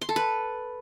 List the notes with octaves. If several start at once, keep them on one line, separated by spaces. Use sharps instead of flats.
C6
A4
B4